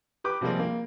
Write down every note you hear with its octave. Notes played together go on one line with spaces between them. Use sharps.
G4 B4 D6
C3 F3 G3 G#3 A#3 C4
A#3